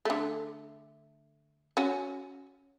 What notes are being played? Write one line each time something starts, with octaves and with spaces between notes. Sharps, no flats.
D3 A3
C#4 F#4